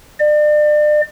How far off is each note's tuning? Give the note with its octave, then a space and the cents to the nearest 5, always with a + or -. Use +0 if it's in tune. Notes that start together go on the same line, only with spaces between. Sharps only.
D5 +35